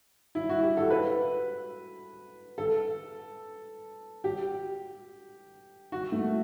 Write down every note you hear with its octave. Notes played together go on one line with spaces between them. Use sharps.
E4
F#4
G4
A4
B4
A4
G4
F#4
A3